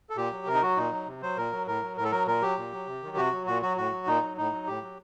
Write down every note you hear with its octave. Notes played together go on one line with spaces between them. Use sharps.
A4
A#2 G4
F#3
C3 A#4
D#4
F#3 F#4
A#2 D#4
F#3
C3
F#3 C5
A#2 A#4
F#3
A2 A#4
F#3
A2 A#4
A4
F#3 A#4
A#2 A#4
F#3 G4
A#2
F#3
C3
D#3 F#3
C3 F#4
F#3
A#2 F#4
F#3 F#4
A2 F#4
F#3
A#2 D#4
F#3
A2 D#4
F#3
A2 G4
F#3